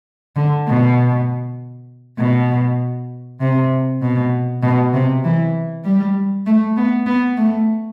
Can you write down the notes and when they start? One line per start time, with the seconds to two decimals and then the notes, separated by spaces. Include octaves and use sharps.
0.36 D3
0.68 B2
2.19 B2
3.41 C3
4.02 B2
4.63 B2
4.93 C3
5.24 E3
5.84 G3
6.46 A3
6.77 B3
7.06 B3
7.37 A3